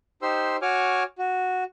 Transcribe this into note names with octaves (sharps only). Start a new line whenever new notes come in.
D#4 G4 C5 C6 E6
F#4 C#5 G#5 C#6 D6 F6
F#4